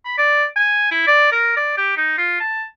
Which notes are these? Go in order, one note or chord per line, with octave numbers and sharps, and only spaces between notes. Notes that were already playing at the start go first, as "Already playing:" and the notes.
B5
D5
G#5
E4
D5
A#4
D5
G4
D#4
F4
A5